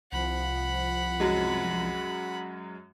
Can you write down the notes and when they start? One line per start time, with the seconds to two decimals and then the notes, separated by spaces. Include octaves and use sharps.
0.12 C2 F3 F#5 B5
1.20 F#2 F#3 G#3